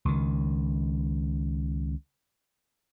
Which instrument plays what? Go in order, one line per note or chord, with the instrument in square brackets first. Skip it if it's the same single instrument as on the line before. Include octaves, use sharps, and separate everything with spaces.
[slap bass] C#2 D#3